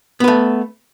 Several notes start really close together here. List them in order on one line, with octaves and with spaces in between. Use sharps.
B3 B4 A3